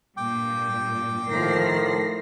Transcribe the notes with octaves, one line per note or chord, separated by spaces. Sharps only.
G2 A#2 G5 D6
A2 D#3 F3 A#4 A#6 C7